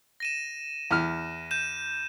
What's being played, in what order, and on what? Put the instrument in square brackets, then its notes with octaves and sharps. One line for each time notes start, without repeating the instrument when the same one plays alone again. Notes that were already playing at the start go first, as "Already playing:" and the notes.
[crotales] A#6 D#7 E7
[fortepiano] E2 F6
[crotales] G6 D#7 E7